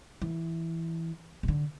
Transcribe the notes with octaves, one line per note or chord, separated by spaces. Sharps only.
E3
C3
D3